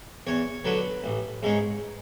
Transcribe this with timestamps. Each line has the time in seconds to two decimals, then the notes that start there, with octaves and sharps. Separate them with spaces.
0.27 E2 C#5
0.65 D3 F#3 B4
1.04 A1
1.43 G#2 G#3 C#4